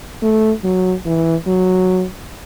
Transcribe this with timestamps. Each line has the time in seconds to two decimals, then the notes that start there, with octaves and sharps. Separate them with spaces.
0.22 A3
0.64 F#3
1.06 E3
1.47 F#3